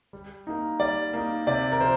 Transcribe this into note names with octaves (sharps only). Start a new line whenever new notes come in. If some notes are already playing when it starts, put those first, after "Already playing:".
G3
A#3 D#4
G3 D5
A#3 D#4
C3 D5
A#4
F3 C5